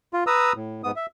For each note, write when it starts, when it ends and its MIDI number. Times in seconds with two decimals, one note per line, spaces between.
0.13 0.24 65
0.27 0.53 71
0.27 0.53 82
0.27 0.53 87
0.27 0.53 88
0.55 0.82 45
0.84 0.91 44
0.84 0.91 59
0.84 0.91 87
0.96 1.06 76